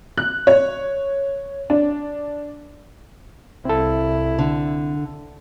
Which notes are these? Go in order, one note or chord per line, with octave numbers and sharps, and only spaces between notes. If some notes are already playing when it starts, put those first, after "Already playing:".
F#6
C#5
D4
C2 C4 E4 A4
D3